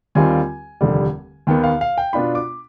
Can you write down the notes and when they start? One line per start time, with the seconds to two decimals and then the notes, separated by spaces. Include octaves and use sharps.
0.15 D#2 D#3 G3 C4 F4 G#5
0.81 F1 D#2 D3 G3
1.47 D#2 D#3 B3 G5
1.64 F5
1.81 F5
1.98 G5
2.13 B2 B3 D4 F4 B5
2.35 D6